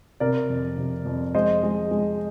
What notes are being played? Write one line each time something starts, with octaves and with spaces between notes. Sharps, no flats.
C3 A#4 D5
F2
C3
F2
G#3 C5 D#5
G#3
G#3